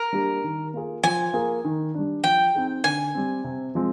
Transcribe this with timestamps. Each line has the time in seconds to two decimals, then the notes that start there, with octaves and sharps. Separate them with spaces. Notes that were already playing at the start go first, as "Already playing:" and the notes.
Already playing: A#4
0.13 G3 A#3 D4 G4
0.44 D#3
0.74 A#3 F4 G#4
1.03 F3 G#5
1.33 A#3 F4 G#4
1.65 D#3
1.94 G3 D4
2.24 F3 G5
2.55 C4 D#4 G#4
2.84 D3 G#5
3.14 G3 C4
3.44 C3
3.75 F3 G#3 C4